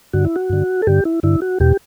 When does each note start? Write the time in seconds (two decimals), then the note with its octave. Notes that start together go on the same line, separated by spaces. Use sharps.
0.13 G2 D3 F#4
0.25 E4
0.36 F#4
0.50 G2 D3
0.82 A4
0.87 G2 D3 G4
1.05 E4
1.23 G2 D3 E4
1.42 F#4
1.60 E2 B2 G4